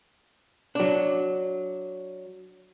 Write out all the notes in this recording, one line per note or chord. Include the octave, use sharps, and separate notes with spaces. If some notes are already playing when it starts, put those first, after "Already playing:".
F#3 D4